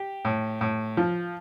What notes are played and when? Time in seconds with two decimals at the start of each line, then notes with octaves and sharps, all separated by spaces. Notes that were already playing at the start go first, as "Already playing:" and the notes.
Already playing: G4
0.25 A2
0.61 A2
0.97 F3